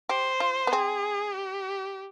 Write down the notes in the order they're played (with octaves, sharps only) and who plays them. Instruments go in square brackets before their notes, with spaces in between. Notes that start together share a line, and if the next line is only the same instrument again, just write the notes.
[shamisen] G4 [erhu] C5
[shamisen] F4
B3
[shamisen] C4 [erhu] G#4
[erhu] G4